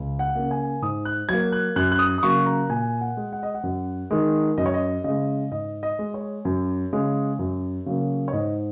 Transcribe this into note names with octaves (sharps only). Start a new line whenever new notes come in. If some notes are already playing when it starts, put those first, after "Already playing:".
Already playing: C#2
F#5
C#3 A#3
G#5
G#2 D#6
F#6
F#3 A#3 G#6
F#6
F#2 F#6
F#6
D#6
D#6
C#3 F#3 A#3 C#6
A#5
A#2 G#5
F#5
G#3
F#5
D#5
F#5
F#2
D#3 G#3
F#2 D#5
C#5
D#5
C#3 G#3 D#5
G#2 D#5
D#5
G#3
C#5
F#2
C#3 G#3
F#2
C#3 F#3 A#3
C#5
G#2 D#5